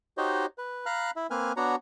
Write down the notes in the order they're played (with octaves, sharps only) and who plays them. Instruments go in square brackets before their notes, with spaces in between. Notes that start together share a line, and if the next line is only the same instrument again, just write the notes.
[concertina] D#4 F#4 G4 C5 C#5 D#5
B4
F5 A#5 B5 F6 F#6
E4 E5
A#3 C4 B4 G#5 F6
B3 D4 F#4 C#5 F#5 A#5